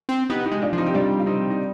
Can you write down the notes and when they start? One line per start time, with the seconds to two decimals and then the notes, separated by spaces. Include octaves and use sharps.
0.09 C4
0.29 B3 D#4 G4
0.46 D#4 G4
0.52 G#3
0.62 D4 F4
0.73 F3
0.78 C4 D#4
0.86 G4
0.94 G3 D4 F4
1.20 F4
1.26 C4 D#4
1.50 D#4